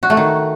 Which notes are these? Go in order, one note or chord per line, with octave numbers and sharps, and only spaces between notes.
F#4
A3
D#3